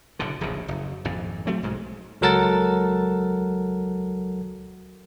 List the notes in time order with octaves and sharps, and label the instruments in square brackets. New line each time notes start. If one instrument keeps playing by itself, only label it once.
[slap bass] F#1 F#2 B2 D3
D1 A#1 D#2 C#3
F#1
G#1 F2 A#2
F#3 A3 C4
B1 G#2 G#3
[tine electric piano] C#2 F#3 A4 A#4 F#5 A6